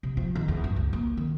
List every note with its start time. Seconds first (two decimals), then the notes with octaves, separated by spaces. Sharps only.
0.03 C3
0.17 F3
0.35 D#3
0.48 E2
0.64 G2
0.76 C#2
0.93 A#3
1.17 D#3